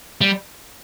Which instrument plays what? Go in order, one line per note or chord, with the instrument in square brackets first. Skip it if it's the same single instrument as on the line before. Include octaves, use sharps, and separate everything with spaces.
[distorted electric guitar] G3